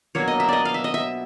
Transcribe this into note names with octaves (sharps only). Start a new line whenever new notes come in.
B2 F#3 A#3 D4 C#5
D#5
E5
D5 D#5
F5
E5
D#5
E5